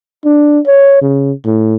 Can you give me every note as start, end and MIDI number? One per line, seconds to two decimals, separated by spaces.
0.25 0.59 62
0.67 1.02 73
1.02 1.32 49
1.46 1.76 45